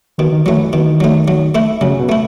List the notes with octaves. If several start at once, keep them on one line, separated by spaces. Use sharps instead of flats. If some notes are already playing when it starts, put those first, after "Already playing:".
B2 D#3
D#3
E3 F#3 A3
E3
B2 D#3
F#3 A3
F#3
A3 E4
C#3 F#3
B2
A3 E4